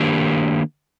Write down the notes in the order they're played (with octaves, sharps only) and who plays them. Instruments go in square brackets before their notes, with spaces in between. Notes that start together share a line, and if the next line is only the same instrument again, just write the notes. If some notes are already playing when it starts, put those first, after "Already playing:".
Already playing: [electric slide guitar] D#3 A#3 D4 G4